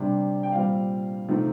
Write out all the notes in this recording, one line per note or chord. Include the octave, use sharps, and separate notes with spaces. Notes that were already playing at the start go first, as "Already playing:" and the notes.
Already playing: C3 G3 D4
G5
A#2 G3 C4 F5
C3 F3 A3 C4 D#4